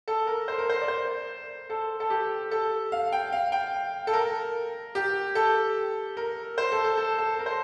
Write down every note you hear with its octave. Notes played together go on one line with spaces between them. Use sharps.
A4
A#4
C5
A#4
C5
D5
C5
A4
A4
G4
A4
F5
G5
F5
G5
A4
A#4
G4
A4
A#4
C5
A4
A4
A4
A4
A#4
C5